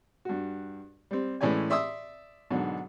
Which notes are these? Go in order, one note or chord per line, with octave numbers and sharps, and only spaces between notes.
G2 F#4
G3 C4
A2 E3 G#3 C#4 D5 G#5
D5 E5 C6 D#6 E6
G#2 B2 D3 F#3